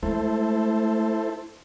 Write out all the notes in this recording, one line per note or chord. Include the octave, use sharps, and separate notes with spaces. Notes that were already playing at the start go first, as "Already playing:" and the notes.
G#3 A3 E4 A4 C5